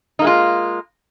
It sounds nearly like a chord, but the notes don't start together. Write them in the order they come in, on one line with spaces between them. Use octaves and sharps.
D#4 A#3 G#3 F4